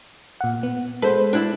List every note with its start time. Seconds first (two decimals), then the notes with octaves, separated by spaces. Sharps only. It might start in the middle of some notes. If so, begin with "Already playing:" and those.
0.41 A#2 F#5
0.63 B3
1.02 G#3 A4 B4 C5
1.33 D4 E4 D5